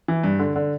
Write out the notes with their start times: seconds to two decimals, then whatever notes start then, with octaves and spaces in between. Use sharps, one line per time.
0.08 E3
0.24 G2
0.39 D3
0.56 D3